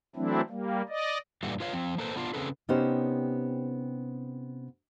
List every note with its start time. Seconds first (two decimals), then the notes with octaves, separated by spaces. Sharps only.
0.16 E3 F#3 A3 C4 D4 E4
0.50 G3 A#3
0.89 D5 D#5
1.43 G2 A#2 E3 G3 A3 F#4
1.60 F4 B4 C#5 F5
1.73 F3 C4
1.98 A#3 A4 B4 C5
2.16 B3 D4 F4
2.34 C#3 C4 C#4 G#4 A4 B4
2.69 C3 B3 C#4 D#4 G4 C5